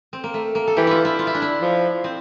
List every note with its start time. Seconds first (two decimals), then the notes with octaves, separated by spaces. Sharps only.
0.13 C4
0.24 A#3
0.34 A3
0.55 A#3
0.67 A4
0.77 E3 G4
0.87 E4 F4
1.05 E4
1.19 F4
1.27 E4
1.35 D4
1.42 E4
1.62 F3
2.04 C4